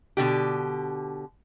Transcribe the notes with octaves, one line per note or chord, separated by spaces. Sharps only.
B2 D3 G4